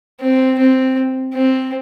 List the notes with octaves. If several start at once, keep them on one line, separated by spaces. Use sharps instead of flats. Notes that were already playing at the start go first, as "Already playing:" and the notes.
C4
C4
C4